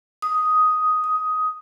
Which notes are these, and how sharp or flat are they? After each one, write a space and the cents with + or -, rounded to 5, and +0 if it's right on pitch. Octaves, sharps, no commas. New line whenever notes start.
D#6 +5
D#6 +15